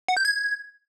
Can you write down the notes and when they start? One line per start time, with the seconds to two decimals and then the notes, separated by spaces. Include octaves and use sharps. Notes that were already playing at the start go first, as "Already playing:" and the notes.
0.08 F#5
0.17 G6
0.25 G#6